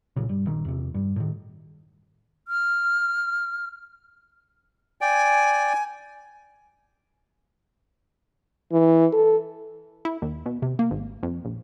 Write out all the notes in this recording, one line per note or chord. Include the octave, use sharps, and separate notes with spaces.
B1 A#2 C#3
G2
A#1 D#3
E2 C3
G2
A2 D#3
F6
D5 G5 G#5
E3
A4
E4
D#2
B2
C3
A#3
G#1
F2
A#1